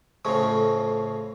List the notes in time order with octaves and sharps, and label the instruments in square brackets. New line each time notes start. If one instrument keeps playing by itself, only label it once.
[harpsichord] F2 A2 C#3 F3